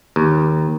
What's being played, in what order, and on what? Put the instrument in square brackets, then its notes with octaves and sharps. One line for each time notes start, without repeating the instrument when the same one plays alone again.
[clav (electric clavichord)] D#2